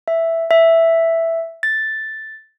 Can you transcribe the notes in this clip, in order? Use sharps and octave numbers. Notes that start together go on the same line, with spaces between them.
E5
E5
A6